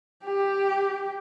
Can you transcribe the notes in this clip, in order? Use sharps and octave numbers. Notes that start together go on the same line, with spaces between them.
G4